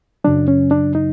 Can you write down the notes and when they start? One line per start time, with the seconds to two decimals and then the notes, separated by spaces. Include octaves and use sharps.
0.24 F#2 C#3 F#3 D4
0.48 C#4
0.71 D4
0.95 D#4